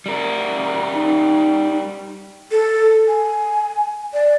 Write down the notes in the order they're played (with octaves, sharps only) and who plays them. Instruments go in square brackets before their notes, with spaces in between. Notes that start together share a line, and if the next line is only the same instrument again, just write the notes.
[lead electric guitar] G3 A#4
[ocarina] D#4
[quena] A4
G#5
D5